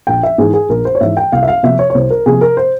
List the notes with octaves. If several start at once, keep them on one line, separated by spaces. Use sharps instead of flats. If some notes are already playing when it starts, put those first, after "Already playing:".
A#1 G5
E5
G#2 E3 G#4
G#4
A#1 A#4
C5
C#5
G#2 E3 E5
G5
C2 F5
E5
F5
C3 F3 A#3 E5
C#5
C#5
C2 C5
A#4
C3 F3 A#3 G#4
A#4
C5